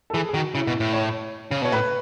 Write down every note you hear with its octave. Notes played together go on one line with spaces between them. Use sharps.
A4
E3 G#4
G#4
D#3 F#4
C#3 E4
B2
A2
C#5
C#3
B2 C#5
A2 B4